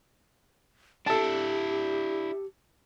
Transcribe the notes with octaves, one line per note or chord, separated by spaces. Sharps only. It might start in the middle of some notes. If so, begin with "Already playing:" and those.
D4 E4 G4 A4 A5